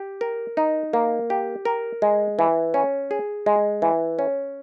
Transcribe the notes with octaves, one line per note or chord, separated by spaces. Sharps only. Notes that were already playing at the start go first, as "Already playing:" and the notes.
Already playing: G4
A#4
D#4
A#3
G4
A#4
G#3
E3
C#4
G#4
G#3
E3
C#4